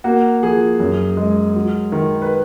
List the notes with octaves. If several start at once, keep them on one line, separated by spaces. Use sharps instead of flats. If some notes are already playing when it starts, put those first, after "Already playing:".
A#3 F#4
F3 G#4
F#2
G#3
F#3
D#3
B4